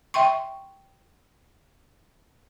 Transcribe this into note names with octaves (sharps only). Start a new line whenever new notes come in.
E5 G5 C6 C#6